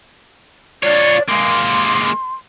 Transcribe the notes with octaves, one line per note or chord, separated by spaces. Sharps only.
F4 C#5 D5
G#3 A#3 C6